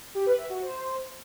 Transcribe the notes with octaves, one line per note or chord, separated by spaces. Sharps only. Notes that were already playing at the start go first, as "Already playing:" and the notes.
G4
B4
E5
F#4
C5